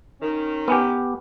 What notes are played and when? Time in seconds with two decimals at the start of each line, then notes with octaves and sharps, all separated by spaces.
0.21 D#3 C#4
0.68 B3 G4 B4 G#5